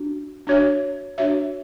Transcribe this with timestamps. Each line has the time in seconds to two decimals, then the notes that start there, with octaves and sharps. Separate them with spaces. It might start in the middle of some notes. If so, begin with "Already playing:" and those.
Already playing: D4 F#4
0.47 D4 F#4 C#5 E5
1.18 D4 F#4 C#5 E5